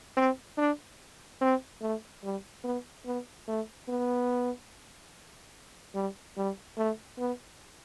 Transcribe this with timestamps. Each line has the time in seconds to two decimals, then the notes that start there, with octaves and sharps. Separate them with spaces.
0.17 C4
0.58 D4
1.41 C4
1.82 A3
2.23 G3
2.64 B3
3.06 B3
3.48 A3
3.89 B3
5.95 G3
6.37 G3
6.77 A3
7.18 B3